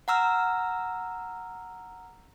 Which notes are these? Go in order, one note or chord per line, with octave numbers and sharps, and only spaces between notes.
F#5 A#5 E6 F6